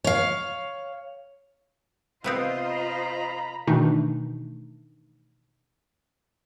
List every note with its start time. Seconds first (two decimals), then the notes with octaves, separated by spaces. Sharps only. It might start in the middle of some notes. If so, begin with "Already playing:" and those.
0.04 C#5 F5
2.24 C3 B3 C4 F4 C5 D#5
2.70 A#5 B5
3.67 B2 D#3 E3 A3 D4 D#4